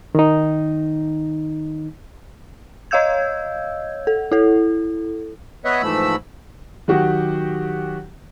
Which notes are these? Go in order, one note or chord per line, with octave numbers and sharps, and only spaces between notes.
D#3 D#4
C#5 D#5 F5 E6 G6 G#6
A4
E4 A4
B3 B4 C#5 D#5 E5 F#5
G#2 E3 F3 A3 B5 E6
D#3 F#3 F#4 G4